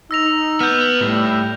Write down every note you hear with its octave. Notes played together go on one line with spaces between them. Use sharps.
D#4 E6 A#6 F7
B3 F6 G6
A2 G3